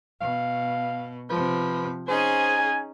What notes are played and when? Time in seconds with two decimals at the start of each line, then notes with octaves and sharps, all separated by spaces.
0.21 B2 F5
1.30 C3 F3 B4
2.08 C#4 D#4 G#4 C5 G#5